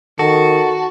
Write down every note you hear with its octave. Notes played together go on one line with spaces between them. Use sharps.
D#3 F#4 A4 A5